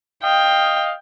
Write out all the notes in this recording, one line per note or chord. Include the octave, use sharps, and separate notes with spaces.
D#5 F5 G5